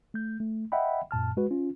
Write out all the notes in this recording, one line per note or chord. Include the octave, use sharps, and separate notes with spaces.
A3 G6
A3
D#5 E5 F#5 G5 B5
F#2 A#2 A5 F6
G#3 F#4 B4
C#4 F4